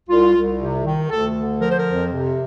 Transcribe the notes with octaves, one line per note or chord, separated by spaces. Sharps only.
C2 F4
C2
C3
D#3
D2 A4
D3
F3 A#4
C5
A#4
F2
C3